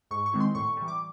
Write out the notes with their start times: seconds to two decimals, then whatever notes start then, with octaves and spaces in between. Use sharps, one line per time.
0.11 G#2 C#6
0.26 C#6
0.33 D#3 G#3 C4 E4
0.40 C6
0.55 A2 C#6
0.77 E3 G3
0.88 D6